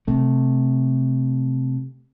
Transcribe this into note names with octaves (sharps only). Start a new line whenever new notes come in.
C3 A3